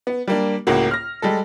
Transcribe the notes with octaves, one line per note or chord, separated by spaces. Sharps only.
B3
G3 A#3 D4
C#2 A2 A#3 F#4
F6 A#6
G3 G#3 A4